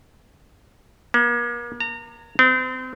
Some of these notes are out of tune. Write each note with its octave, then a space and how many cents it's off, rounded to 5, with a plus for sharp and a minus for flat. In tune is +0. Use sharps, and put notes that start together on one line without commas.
A#3 +40
A#5 -30
C4 -35